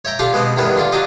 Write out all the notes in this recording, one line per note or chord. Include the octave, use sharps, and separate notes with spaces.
C#5 E5 G5 A#5
D4 F4 G4 A4 F5
B2 G#3 B3 C4
E2 G2 D3 D#3 G#3 B3
D3 F4 D5
F#3 D4 F4 G4 D#5